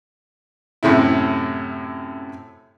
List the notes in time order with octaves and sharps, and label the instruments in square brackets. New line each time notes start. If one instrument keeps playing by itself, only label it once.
[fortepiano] F#2 A2 C3 E4